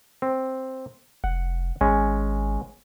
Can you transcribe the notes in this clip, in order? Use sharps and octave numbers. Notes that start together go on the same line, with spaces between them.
C4
F1 F#5
G#1 G#3 C#4